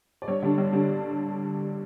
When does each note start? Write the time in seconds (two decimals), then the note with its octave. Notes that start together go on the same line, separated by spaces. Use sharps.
0.22 D5
0.28 G2 C#5
0.42 D3 G3 D4
0.58 G2
0.73 D3 G3 D4